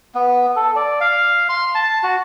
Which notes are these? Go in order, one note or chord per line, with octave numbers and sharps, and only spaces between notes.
B3
A4
D5
F5
C6
A5
F#4